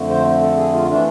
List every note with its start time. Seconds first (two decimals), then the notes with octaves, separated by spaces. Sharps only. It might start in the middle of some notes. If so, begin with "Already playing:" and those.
Already playing: F2 D3 A3
0.09 C5
0.41 A4
0.56 G#4
0.73 F4
0.88 E3 A3 D4